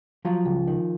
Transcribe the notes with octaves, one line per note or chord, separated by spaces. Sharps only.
F3 F#3 F4
C#2
D#3